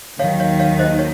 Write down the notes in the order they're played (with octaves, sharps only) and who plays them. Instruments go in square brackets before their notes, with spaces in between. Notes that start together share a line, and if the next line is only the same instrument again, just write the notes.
[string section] D#2 D#3 F#3 [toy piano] C#5 F5
[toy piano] C#5 F5
C#5 F5
C5 D#5
C#5